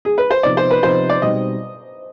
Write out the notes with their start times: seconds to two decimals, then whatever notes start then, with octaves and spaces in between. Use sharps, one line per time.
0.05 G#4
0.18 B4
0.31 C5
0.43 C3 F3 B3 D#4 D5
0.57 C5
0.71 B4
0.83 C3 F3 B3 D#4 C5
1.10 D5
1.22 B2 G3 C4 D#4 D#5